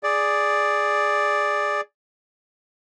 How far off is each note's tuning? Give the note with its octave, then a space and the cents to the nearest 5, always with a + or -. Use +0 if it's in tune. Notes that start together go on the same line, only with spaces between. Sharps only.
G#4 +0 D5 +0